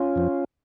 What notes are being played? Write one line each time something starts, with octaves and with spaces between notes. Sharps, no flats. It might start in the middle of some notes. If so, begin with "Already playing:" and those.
Already playing: C#4 F4
F2 F3